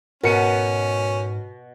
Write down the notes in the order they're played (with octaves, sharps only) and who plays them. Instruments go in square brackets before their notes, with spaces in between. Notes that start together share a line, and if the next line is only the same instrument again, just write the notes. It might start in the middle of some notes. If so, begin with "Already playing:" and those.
[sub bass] G#2 [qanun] B2 [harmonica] C#4 [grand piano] A#4 C#7 D#7